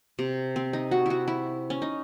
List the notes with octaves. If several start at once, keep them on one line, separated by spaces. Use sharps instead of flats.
C3
C4
D#4
F#4
E4 F#4
E4
C#4
D#4